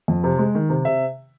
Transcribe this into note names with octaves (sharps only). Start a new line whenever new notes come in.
F2
C3
G#3
D#3
C3
C3 E5